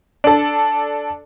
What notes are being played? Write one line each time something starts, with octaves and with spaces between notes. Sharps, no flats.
D4 A4